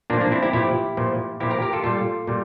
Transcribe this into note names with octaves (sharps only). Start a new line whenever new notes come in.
A#2 F3 A#3 D4
A#3 D4
C4 E4
E4 G4
A#2 F3 E4 G4
A#2 F3
A#2 F3 E4 G4
G4 A#4
G4 A#4
F4 A4
A#2 G3 F4 A4
A#2 G3